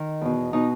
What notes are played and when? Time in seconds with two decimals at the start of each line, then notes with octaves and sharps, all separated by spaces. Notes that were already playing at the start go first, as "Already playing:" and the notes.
Already playing: D#3
0.21 E2 B2
0.53 B2 D#4